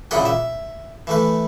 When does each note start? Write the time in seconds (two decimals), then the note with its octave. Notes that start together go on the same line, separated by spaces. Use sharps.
0.11 A#2 C#3 E4 D5 F#5 G5
0.25 E5
1.07 E3 A3 B4